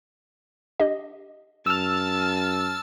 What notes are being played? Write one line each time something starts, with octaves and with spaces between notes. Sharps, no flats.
D4 G4 D#5
F#2 A5 E6 F6 A6